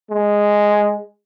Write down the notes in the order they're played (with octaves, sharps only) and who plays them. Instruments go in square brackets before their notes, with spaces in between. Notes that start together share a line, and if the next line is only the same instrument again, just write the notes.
[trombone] G#3